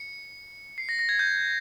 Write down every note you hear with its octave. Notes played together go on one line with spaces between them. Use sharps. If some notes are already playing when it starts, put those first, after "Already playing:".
Already playing: C#7
C7
A#6
A#6
G#6
G6